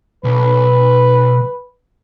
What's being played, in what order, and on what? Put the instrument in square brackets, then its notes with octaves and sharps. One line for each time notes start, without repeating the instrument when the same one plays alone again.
[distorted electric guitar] B1 [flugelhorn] B4